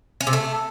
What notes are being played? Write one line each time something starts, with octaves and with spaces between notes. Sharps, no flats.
C#4
C3
A3